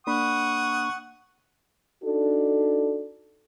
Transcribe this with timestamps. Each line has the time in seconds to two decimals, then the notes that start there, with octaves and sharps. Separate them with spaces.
0.07 A#3 D4 F#5 B5 C#6 D#6
2.03 D4 D#4 F#4 A4